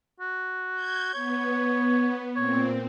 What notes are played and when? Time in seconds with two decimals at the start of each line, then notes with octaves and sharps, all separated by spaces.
0.20 F#4
0.75 G6 G#6
1.14 B3 C#5
2.36 A#2 C4 C#5